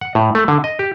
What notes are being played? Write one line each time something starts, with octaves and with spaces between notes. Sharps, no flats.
F#5
A2
A3
D3
D#5
G4